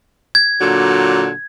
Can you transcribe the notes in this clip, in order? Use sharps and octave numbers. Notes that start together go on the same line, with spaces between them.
G#6
A#2 D3 F#3